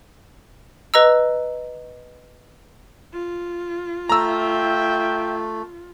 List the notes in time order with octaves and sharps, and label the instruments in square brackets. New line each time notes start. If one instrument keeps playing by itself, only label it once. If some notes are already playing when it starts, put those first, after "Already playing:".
[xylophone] B4 D#5 A#5 E6
[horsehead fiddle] F4
[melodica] A3 [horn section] E5 F5 G5 [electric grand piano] A#5 E6